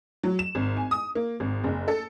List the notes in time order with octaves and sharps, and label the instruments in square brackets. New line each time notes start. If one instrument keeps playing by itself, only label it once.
[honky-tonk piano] F#3
E7
G#1
G#5
D#6
A#3
G#1
F#1
A4